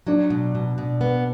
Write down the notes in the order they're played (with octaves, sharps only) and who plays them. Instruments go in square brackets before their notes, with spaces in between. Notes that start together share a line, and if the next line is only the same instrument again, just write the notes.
[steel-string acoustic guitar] F#3 [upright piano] D4
[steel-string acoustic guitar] B2
B2
B2
B3